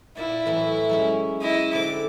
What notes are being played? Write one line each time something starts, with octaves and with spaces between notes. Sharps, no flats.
A#2 E4 D5
A2 E3 F#3
F#3 G#3 C#4
E4 D#5
D3 C4 A4 D6